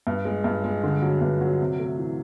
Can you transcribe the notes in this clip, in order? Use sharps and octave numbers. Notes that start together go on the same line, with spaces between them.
G2
G#3
G2
G#3
D3
F#3
G2
F#3
C3
A3
E3